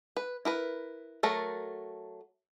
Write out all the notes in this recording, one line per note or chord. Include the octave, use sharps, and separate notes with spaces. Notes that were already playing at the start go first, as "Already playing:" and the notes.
B4
E4 A#4 B4
F#3 A3 A4 A#4